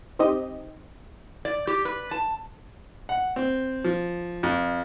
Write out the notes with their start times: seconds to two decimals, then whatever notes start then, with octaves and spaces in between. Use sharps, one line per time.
0.19 C4 D#4 G4 D#5
1.45 D5
1.67 G4
1.85 B4
2.11 A5
3.09 F#5
3.36 C4
3.84 F3
4.43 F2